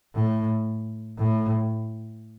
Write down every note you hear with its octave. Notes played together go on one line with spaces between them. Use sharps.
A2
A2